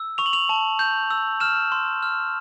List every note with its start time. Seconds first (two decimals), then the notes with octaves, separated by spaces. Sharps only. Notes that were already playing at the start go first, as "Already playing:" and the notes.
Already playing: E6
0.18 C#6 F7
0.26 F#7
0.33 F7
0.49 A5
0.79 G6
1.11 E6
1.40 F6 E7
1.72 C6
2.03 F6